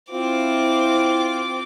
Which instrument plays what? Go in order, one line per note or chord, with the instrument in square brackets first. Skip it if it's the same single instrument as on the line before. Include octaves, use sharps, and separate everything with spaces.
[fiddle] C4 D6 [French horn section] E4 [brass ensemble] F4